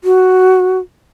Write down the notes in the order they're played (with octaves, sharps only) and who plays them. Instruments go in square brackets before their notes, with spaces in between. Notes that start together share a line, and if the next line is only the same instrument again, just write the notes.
[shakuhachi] F#4